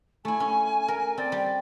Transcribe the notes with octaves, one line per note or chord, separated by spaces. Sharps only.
A3 E4 G#5
C#4
A#4
C4 D5
G3